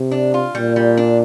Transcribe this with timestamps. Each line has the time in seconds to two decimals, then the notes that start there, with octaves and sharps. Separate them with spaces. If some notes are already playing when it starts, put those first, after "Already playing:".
Already playing: C3
0.11 D4
0.34 F4
0.55 A#2 G3
0.76 G3
0.97 D4